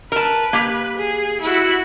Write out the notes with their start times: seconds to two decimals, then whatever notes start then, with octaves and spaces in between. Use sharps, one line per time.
0.12 A#4 B4 A5
0.53 A#3 G4
0.97 G#4
1.42 E4 F#4